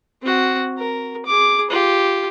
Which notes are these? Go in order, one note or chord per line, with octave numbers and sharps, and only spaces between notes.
C4 F#4
A#4
G#4 D6
F4 G4